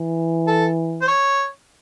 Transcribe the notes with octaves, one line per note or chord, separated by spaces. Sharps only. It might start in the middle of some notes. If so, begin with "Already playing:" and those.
Already playing: E3
A4
C5
C#5